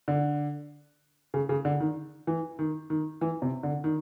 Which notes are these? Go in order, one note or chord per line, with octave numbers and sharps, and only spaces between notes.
D3
C#3
C#3
D3
D#3
E3
D#3
D#3
E3
C3
D3
D#3